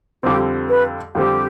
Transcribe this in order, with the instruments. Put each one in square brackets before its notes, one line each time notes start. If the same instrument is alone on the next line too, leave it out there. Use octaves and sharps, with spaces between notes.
[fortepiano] F2 D3 G3 C4 [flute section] G4
[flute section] B4
[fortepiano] F2 D3 G3 C4 [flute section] G4